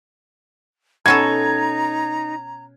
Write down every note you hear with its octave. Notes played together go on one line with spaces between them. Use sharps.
B2 C#4 D#4 A4 A#5 G#6